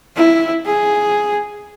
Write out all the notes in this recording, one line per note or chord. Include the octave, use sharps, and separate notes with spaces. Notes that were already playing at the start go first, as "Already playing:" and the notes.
E4
G#4